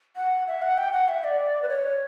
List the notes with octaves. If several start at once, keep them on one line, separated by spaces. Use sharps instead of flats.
F#5
E5
F#5
G5
F#5
E5
D5
B4
C#5